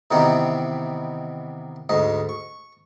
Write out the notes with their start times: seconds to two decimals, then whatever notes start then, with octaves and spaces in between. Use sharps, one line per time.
0.11 C3 D#3 E3 B3 D#4 G4
1.89 D2 G#2 D#5
2.29 C#6